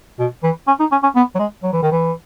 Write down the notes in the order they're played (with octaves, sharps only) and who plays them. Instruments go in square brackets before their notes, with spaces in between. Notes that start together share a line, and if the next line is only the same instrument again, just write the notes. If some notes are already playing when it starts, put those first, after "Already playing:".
[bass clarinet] B2
E3
C#4
D#4
C#4
C#4
B3
F#3
G#3
F#3
E3
D#3
E3